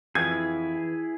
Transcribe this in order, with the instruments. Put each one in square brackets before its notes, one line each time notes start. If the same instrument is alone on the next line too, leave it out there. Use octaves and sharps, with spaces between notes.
[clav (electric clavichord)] F2 [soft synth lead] E3 [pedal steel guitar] E4 G#4 [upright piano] G#6